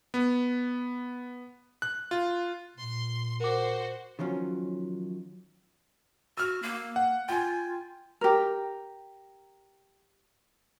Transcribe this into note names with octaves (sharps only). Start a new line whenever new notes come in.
B3
F#6
F4
A#2 C6
F#4 A#4 C5 D6
D#3 F3 F#3 C#4
F#4 E6 F6
A#3
F#5
F4 G5 G#5
G4 A#4